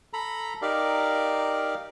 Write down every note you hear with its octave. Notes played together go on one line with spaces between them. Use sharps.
A4 A#5 B5
D#4 G4 A#4 D5 F5